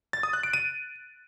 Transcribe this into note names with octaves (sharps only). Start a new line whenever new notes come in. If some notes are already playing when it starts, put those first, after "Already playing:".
A6
D#6
F#6
D7
D#7